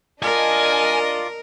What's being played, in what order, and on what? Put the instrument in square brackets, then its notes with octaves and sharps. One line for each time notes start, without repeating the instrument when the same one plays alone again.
[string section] D4 D#5 [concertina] F4 D5 [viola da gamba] A#4 [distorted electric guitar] G#5